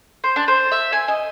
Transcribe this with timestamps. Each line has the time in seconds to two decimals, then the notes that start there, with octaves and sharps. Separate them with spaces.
0.24 C5
0.36 D4
0.48 C5
0.72 E5
0.92 G#5
1.08 D#5